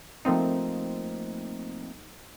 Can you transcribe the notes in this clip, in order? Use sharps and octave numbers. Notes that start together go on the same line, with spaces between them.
F3 A3 A#3 C4 D#4